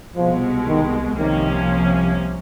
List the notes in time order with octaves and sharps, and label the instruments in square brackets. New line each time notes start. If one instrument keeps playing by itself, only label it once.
[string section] C2 B2 G#3 [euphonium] F3
[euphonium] D#3
[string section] C2 C3 F3 A#3 C#4 [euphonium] D#3